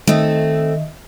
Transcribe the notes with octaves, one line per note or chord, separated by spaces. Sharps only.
D#3 A3 C4 D#5 E5